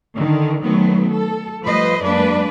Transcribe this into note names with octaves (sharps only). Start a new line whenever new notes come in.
D3 D#3
D#3 F#3 A3 B3 C4
A4
F3 G3 A3 B4 C5 D#5
F#2 G#3 A#3 D4 B4 D5